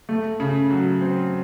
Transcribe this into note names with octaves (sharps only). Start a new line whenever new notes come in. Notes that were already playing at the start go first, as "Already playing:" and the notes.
A3
C#3
F#3
C4